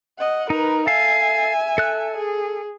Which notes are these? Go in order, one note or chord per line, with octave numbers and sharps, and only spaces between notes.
D#5 F#5
D#4 A#4 B4
A4 E5 F5 G#5
A4 F#6
G#4